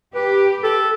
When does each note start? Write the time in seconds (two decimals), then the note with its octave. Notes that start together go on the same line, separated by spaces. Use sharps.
0.15 G4 B4
0.63 A4